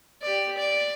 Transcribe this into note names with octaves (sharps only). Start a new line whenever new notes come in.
G4 D5
D5